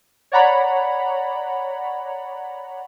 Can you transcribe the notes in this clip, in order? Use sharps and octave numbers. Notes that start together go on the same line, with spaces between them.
C#5 D5 F#5 A#5 B5